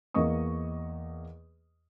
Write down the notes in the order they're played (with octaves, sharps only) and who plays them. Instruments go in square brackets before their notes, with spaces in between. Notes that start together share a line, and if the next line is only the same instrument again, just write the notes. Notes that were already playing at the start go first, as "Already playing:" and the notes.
[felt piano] E2 A#3 D#5 C#6 D#6